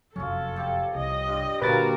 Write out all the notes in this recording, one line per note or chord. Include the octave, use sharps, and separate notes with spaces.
F1 F#2 F#3 C#4 F4 A4
F3 G4
C2 D#5
G2 C6
A#2 D3 A#3 F#4 G4 A#4 B4 A6